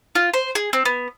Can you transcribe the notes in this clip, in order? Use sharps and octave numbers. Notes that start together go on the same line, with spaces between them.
F4
C5
G#4
C4
B3